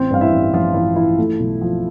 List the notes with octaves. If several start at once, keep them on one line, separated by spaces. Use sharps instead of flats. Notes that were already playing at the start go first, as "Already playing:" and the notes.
Already playing: A1 C4 C5
G2 F5
E4 E5
A1
A1 F3 F4
E3 E4
E3 E4
A3
B1
F3